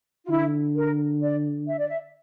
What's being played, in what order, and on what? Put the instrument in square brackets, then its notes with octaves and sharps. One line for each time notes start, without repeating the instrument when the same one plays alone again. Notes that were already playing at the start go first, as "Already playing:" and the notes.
[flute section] F4
[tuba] D3 [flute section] E4
[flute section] A#4
D5
E5
D5
E5